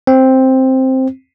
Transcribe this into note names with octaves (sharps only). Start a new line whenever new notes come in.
C4